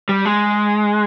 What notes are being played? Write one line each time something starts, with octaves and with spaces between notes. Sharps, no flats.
G3
G#3